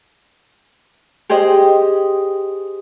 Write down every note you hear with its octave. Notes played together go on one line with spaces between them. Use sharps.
G4 G#4 C5 D#5